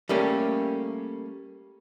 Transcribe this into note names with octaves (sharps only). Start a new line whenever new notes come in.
G3 A3 A#3 C#4 G4